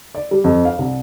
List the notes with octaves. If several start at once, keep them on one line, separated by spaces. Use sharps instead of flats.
D5
G3
F2
F5
C2